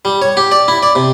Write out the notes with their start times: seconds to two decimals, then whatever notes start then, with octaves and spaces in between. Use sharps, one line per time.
0.05 G3
0.22 C#5
0.37 G4
0.51 D5
0.68 E4
0.83 D5
0.95 C3